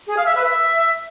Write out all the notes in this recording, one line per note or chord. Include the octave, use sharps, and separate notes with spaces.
G#4
F5
E5
B4
E5